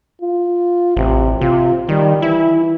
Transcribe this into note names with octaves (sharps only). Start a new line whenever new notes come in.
F4
A1 C3
C3 F4
D#3 G3
E3 E4